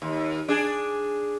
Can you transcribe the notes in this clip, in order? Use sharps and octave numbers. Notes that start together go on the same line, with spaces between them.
D#2
D4 G#4